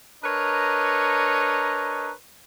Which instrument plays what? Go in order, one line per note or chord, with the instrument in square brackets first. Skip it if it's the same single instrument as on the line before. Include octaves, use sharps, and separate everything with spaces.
[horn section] D4 A#4 B4 C#5 D#5 A#5